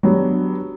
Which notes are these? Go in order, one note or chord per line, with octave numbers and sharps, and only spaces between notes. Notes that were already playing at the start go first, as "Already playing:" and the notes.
F#3 B3 D4 G4